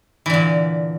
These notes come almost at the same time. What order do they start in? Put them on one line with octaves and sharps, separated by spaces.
E3 D3 A#2